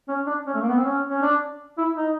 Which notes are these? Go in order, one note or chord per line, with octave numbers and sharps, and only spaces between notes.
C#4
D4
C#4
A3
A#3
B3
C4
C#4
C#4
D4
E4
D#4